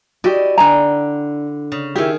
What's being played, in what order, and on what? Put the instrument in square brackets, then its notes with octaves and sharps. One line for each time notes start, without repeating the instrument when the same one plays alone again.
[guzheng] E4 D5 D#5 [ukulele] F#4 G4
[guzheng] D3 G5 [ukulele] D4 G#5 A#5
[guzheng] C#3
[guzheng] D#3 G#4 [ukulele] E4 G4